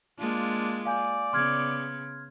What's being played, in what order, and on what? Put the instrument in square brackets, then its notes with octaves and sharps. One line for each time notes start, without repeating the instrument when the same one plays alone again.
[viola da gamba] G#3 A#3 F4 [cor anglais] D4
[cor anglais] D5 [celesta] F5 G#5 G6
[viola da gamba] C#3 B3 [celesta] C6 F6 G#6